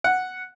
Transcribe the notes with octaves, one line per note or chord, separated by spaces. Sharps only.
F#5